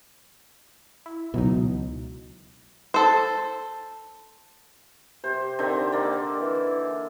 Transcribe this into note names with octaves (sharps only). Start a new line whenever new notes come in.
E4
C#2 B2 E3 F#3 D#4
A4 C5
C3 C5
D3 D#3 C4
A#3 D5
E3